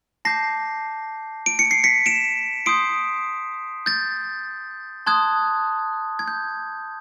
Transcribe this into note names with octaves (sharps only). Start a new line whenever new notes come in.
A5 D6 G6 A#6 C7
D7
C#7
C7
B6 C#7
D7 E7
C6 D#6 G6 C7 D7
G6 A6
A5 C6 D#6 F#6 G#6
G#6
G6